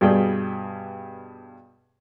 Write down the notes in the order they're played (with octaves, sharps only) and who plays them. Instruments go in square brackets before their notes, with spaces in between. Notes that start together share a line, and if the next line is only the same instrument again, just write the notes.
[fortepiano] G2 B2 G3 G#4 D5 G5